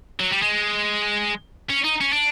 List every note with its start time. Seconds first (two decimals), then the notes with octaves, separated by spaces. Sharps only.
0.20 F#3
0.31 G3
0.42 G#3
1.70 C#4
1.84 D#4
2.01 C#4
2.13 D4